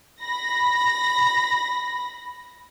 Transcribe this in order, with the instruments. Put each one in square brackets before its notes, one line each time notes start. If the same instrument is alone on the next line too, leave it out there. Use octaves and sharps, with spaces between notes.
[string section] B5 A#6